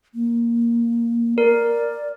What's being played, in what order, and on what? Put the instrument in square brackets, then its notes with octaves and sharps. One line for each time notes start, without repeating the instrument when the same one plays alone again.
[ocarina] A#3
[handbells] A#4 [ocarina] D5